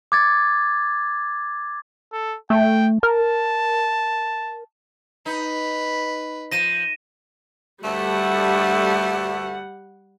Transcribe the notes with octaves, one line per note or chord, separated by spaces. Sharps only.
D6 G#6 A6
A4
A3 G5
A#4 A5
D#4 B4
F3 A#6 D#7 E7
D2 G2 G3 A3 F#5